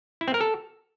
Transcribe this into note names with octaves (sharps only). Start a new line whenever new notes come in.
E4
C4
A#4
A4